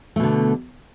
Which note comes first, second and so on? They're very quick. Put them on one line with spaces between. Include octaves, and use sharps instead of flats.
A3 B2 D3